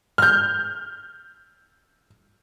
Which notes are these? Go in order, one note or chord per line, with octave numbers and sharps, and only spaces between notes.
F6 G6